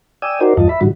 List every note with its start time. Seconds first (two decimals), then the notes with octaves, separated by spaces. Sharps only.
0.22 D5 G5 G#5 D#6 E6
0.41 D#4 F#4 A#4 C5 D5
0.57 E2 G2 F4 D#5 A5
0.69 E5 B5
0.81 G#2 D3 D#3 G3 F#4